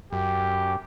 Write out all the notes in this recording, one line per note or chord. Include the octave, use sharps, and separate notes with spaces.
F#2 G4